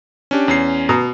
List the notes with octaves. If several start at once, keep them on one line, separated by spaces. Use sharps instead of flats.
C#4 D4 G4
E2 C#4 C7
B2 A#5 D#6